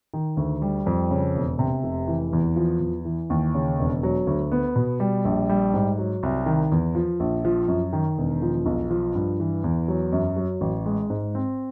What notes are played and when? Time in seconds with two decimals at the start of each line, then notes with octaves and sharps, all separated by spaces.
0.14 D#3
0.37 D2
0.62 G3
0.86 F2
1.11 C#3
1.35 E1
1.59 C3
1.84 F1
2.08 E3
2.33 E2
2.56 F3
2.81 E2
3.05 E3
3.30 D#2
3.54 C#3
3.79 E1
4.03 F#3
4.27 D2
4.52 B3
4.76 B2
5.00 G3
5.25 A#1
5.49 G3
5.74 G#2
5.99 F#3
6.23 C2
6.46 D#3
6.72 E2
6.95 F3
7.20 A#1
7.45 F3
7.68 F#2
7.93 D#3
8.18 E1
8.42 F3
8.66 B1
8.91 F3
9.15 G2
9.40 E3
9.64 E2
9.88 F#3
10.12 F#2
10.36 F#3
10.61 A1
10.86 G#3
11.10 G#2
11.35 C4